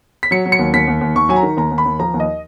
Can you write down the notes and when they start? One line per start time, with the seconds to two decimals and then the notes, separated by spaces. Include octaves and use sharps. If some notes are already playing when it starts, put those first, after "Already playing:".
0.23 B6
0.31 F#3 C#7
0.46 F#3
0.52 C#7
0.59 D#2
0.73 D#2 B6
0.87 D#2
1.01 D#2
1.15 D#2 C#6
1.29 F#3 G#5
1.36 A#5
1.43 D#3
1.57 D#2 A#5
1.71 D#2
1.78 B5
1.85 D#2
1.99 F3 A#5
2.14 D#2
2.20 D#5